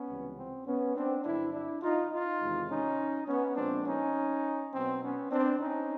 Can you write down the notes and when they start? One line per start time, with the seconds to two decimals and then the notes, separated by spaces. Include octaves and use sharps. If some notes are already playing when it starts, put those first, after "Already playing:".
Already playing: B3 C#4
0.08 C#2 C3 E3 G3
0.37 C4
0.66 B3 C#4
0.95 C4 D4
1.24 G2 D3 F#3 D4 E4
1.53 D4 E4
1.82 D#4 F4
2.11 D#4 F4
2.41 E2 C3 D#3 G#3
2.70 C#4 D#4
3.28 B3 C#4
3.56 A#2 F3 G#3 B3 C4 D4
3.86 C#4 D#4
4.73 B2 F#3 B3 C4
5.02 B3 C#4
5.31 C4 D4
5.60 C#4 D#4